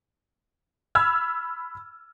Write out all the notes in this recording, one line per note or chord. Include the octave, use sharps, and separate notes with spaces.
B5 E6 F6 G#6